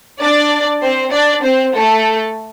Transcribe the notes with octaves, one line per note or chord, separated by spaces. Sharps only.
D4 D5
C4 C5
D4 D5
C4 C5
A3 A4